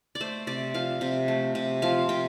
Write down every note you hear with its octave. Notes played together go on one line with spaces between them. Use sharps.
D5
A3 C5
C3 D5
F3 F5
C3
A3
C3
F3 F5
C3 G5